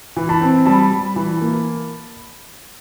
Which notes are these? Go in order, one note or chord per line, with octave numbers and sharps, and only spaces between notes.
E3
A5 B5
C4
G3 A5 B5
G3
E3
A#3